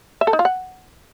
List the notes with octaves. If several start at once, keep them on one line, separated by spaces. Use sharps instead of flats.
E5
A4
D#4
F4
F#5